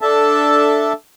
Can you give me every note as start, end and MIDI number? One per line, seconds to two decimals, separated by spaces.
0.01 0.93 62
0.01 0.93 69
0.01 0.93 76
0.01 0.93 81